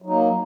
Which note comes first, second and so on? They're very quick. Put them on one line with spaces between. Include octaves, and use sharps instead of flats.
F#3 D#4 A#3